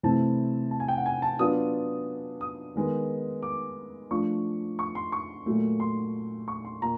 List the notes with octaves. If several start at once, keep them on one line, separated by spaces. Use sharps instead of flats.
C3 E3 A3 C4 E4 A5
A5
G#5
G5
F#5
G#5
A5
F#3 B3 D4 F4 D#6
D#6
D#3 G#3 B3
D6
F3 A3 D4 F4 C#6
C#6
C6
C#6
A#2 F#3 A3
C6
C#6
C6
A#2 A#5